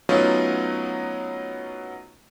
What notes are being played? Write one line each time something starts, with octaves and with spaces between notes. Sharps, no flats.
F#3 A3 B3 C#4 D#4 F4